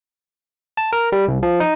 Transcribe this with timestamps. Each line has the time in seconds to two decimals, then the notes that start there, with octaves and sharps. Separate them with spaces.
0.77 A5
0.93 A#4
1.12 G3
1.28 C2
1.43 F3
1.60 D#4